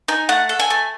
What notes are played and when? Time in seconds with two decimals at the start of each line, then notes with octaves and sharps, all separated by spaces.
0.08 D#4 G#5
0.29 A3 F#5
0.49 A4
0.60 G#5
0.70 A3